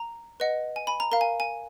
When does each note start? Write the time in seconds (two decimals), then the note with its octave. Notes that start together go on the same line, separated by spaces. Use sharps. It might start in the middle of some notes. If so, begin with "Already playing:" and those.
Already playing: A#5
0.40 B4 D#5 F#5
0.76 G#5
0.87 G#5 B5
1.00 A#5
1.12 A#4 F5 A#5
1.21 G#5
1.40 G#5